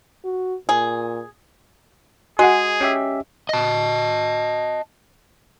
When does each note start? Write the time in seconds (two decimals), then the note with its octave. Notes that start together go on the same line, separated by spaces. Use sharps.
0.24 F#4
0.69 A#2 G#4
2.39 G#3 F#4 G#4 F#5
2.81 C#4 G4 E5
3.49 D#5 A5